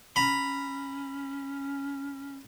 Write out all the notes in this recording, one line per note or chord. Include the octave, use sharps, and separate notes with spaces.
C#4 A#5 B5